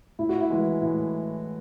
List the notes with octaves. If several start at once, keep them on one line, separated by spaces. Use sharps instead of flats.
A2 E4
F#4
E4
E3 G#3
A2